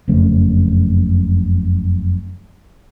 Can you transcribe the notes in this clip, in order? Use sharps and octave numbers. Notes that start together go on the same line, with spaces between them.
F#1 F2 C#3 A3